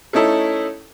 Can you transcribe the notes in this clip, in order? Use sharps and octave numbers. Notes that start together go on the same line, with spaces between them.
A3 C#4 D#4 E4 A4